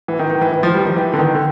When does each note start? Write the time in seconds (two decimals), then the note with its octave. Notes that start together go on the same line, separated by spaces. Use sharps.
0.08 E3
0.19 D#3
0.30 D#3
0.41 E3
0.52 E3
0.63 F3
0.74 G3
0.85 D#3
0.96 E3
1.14 D3
1.18 D#3
1.35 D3